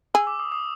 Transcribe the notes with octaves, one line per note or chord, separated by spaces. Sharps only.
G#4 E6
D6
D#6
D#6